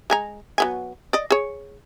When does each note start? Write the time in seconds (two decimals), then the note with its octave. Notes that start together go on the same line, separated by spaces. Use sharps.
0.10 G#3 G#5 A#5
0.58 F#3 B3 G#5
1.13 D5 D#5
1.30 G#4 C#5